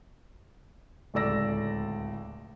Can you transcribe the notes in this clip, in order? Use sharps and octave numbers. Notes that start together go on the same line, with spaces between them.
D1 C#2 A4 D5 E6 A#6